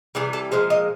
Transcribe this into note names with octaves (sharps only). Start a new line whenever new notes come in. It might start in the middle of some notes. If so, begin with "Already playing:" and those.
C3 E3 G3 G#4
A4
A#2 F3 G#3 C5
D#5